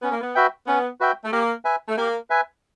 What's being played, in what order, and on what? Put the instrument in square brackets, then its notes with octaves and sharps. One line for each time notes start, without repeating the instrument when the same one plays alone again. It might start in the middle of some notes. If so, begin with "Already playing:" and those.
[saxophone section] B3 [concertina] C#4
[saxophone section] A#3
B3
[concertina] F#4 B4 E5 G5
[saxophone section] B3 [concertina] C#4
[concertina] F#4 B4 E5 G5
[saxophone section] A3
[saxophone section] A#3 [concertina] G4
[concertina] B4 E5 G#5
[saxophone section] A3
[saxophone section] A#3 [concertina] G4
[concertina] B4 E5 G#5